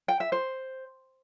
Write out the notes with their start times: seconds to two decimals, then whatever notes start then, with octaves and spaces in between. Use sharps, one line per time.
0.08 G5
0.20 E5
0.32 C5